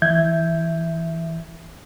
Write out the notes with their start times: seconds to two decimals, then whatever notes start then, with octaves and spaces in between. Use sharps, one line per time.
0.02 E3 E5 G6 G#6